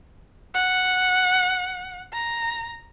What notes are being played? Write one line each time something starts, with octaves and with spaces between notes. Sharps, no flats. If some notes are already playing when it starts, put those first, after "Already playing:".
F#5
A#5